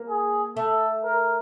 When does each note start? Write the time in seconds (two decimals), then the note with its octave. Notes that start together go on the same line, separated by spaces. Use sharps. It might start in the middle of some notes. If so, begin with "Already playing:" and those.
Already playing: A#3
0.09 G#4
0.57 A3 A4
1.05 A#4